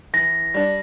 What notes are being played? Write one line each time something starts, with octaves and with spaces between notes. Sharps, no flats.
E3 A#6
G3 D4